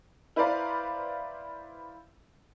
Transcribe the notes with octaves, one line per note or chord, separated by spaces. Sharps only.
E4 B4 C5 D5 F5 A#5